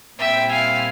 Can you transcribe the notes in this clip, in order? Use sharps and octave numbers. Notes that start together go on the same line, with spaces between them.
A#2 G3 C4 E4 E5 G5
F5 G#5